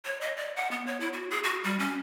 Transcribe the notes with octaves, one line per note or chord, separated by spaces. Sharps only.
C#5
D#5
D5
F#5
B3
C#5
E4
F#4
G#4
F#4
G3
C#4